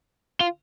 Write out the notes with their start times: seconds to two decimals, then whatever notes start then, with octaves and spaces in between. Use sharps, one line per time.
0.40 F4